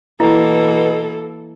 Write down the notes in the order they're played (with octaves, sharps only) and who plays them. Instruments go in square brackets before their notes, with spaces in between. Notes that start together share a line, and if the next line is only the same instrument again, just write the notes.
[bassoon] B2 [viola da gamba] E3 A#3 [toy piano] E4 [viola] A4